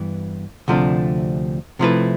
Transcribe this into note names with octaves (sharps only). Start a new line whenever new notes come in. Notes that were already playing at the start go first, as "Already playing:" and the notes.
Already playing: G2 E3 B3
D2 C3 F3 A3 D4
C3 F3 A3 E4 B4